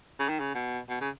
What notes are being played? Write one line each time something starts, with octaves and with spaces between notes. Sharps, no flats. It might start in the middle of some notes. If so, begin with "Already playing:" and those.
C#3
D#3
C#3
B2
B2
C#3